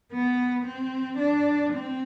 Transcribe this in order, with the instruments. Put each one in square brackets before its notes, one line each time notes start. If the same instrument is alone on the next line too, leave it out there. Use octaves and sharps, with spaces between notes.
[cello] B3
C4
D4
C4